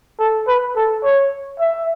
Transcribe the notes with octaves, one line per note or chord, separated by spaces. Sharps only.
A4
B4
A4
C#5
E5